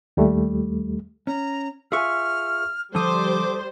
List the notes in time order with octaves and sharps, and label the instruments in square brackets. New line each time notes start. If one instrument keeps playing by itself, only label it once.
[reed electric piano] D#2 G3 A3
[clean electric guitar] C#4 [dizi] A#5
[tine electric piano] F4 E5 C#6 [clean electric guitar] G#4 B4 G#5 [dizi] F6
[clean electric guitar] D3 F3 [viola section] G3 C5 [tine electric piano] A4 D#6 [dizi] D6